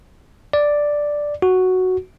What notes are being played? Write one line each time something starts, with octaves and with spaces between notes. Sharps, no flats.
D5
F#4